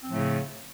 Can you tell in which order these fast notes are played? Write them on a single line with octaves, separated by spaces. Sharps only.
C4 F3 A2 A3 C#3